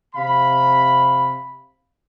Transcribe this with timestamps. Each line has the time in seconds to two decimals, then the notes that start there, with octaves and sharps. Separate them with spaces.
0.15 C3 F5 B5